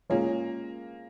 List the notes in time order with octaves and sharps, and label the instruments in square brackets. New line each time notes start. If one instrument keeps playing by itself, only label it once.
[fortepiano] A#2 G#3 C#4 G#4 [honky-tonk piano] A#3